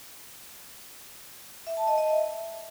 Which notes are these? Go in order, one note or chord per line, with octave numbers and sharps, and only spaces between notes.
E5
A5
D#5
D#5
E5